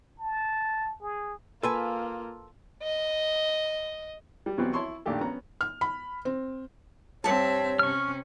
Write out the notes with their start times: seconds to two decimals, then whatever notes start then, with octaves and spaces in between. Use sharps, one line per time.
0.20 A5
1.02 G#4
1.63 A#3 F4 A4 B4 G#5 A5 C6 E6
2.83 D#5
4.46 G3
4.58 B2 E3 F#3 G3 B3 C4
4.73 E4 C#5 A5 C6 C#6
5.06 A#1 A#2 D#3 A3 G4 A4
5.20 B3 C#4 A#5
5.61 F6
5.81 B5
6.25 C4
7.24 G2 C4 C#5 E5 A5
7.79 C3 C#4 C#6 F6